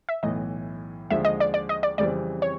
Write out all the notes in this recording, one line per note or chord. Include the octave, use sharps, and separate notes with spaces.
E5
B1 A2 E3 D#5
D#2 D3 F3 G#3 E5
D#5
D5
D5
D#5
D5
F2 C#3 E3 G3 C4 D5
C#5